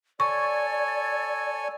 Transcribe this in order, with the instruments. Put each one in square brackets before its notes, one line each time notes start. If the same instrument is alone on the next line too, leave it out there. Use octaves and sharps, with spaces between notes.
[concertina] A4 C#5 G#5 [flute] D5 [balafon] C#6